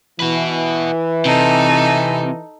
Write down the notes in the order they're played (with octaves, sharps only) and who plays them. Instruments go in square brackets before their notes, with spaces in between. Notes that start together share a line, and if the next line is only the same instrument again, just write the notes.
[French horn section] E3 [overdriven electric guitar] F#4 B4
[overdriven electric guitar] C3 [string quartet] D#4 A4